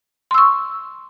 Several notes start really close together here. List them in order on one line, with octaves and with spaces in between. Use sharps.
C6 E6 C#6